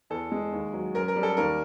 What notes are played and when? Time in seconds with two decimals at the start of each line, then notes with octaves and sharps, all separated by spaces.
0.10 E2 A4
0.31 G#3
0.52 D#2
0.73 F#3
0.94 F#2 A#4
1.08 A#4
1.16 G3
1.23 A4
1.37 D#2 A#4